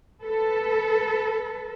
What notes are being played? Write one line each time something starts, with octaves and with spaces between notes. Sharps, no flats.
A4 B4